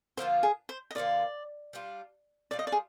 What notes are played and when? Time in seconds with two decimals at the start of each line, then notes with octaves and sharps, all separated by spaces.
0.17 D3 F3 A#3 F4 C5
0.43 G#4
0.69 C5
0.91 D#5
0.95 D3 F3 A#3 F4 D5
1.73 G3 D4 F4
2.51 G3 D4 F4 D5
2.59 D#5
2.67 D5
2.72 G#4